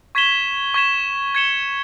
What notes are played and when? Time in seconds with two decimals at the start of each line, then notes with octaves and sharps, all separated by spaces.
0.15 C#6 G#6 B6 E7 G7
0.74 C#6 G#6 B6 E7 G7
1.35 G#6 C#7 E7 G7